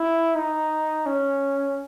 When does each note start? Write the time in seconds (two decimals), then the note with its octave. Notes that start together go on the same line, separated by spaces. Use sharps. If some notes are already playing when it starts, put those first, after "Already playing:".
Already playing: E4
0.36 D#4
1.06 C#4